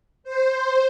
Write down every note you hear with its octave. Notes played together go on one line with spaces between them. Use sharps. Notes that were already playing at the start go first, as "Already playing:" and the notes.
C5